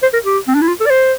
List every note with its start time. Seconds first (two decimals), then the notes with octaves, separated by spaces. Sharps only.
0.03 C5
0.13 A#4
0.25 G4
0.48 C4
0.55 D4
0.62 E4
0.68 F4
0.80 A4
0.86 D5
0.90 C5